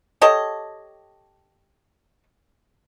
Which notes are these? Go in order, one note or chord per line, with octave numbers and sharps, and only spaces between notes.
G4 A4 C#5 D#5